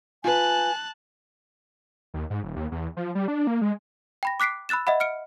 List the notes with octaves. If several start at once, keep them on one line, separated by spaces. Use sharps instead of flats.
F4 B4 G#5 A5 F#6
D#2
G#2
D#1
D#2
E2
F3
G3
D4
A#3
G#3
G5 B5 A#6
D6 F#6 B6 C7 D7
B5 E6 F#6 A6 E7
D#5 E5 F#5 B5
F6 C#7 D7